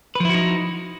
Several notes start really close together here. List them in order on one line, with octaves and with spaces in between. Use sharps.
B4 F3 E4 F#4 D#4